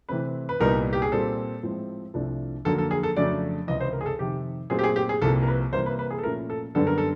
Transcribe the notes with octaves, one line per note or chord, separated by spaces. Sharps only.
C3 E3 A3 C4 B4
B4
C2 A#2 G3 B3 D#4 A#4
G4
G#4
A#2 G3 C4 A4
A2 F3 G#3 C4
C2 C3 F3 A3 D4
F2 D3 F#3 A#3 A4
A4
G#4
A4
F2 C#3 F#3 A3 D4 D5
C#2 C3 E3 D#5
C5
A#4
G#4
A4
F2 C3 D#3 G4
A#2 F#3 A3 C4 G#4
G4
G#4
G4
G#4
C2 C3 F3 A#3 A4
A#4
B4
C3 E3 G3 A#3 C5
B4
B4
G#4
A4
A#2 F3 A3 C#4 E4 A#4
A4
F#2 D3 G3 B3 D4 A4
A#4
A4